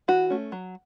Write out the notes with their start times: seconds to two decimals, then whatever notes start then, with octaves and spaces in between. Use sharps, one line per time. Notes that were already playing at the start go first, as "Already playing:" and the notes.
0.08 E3 F#4
0.30 A3 C#4
0.52 F#3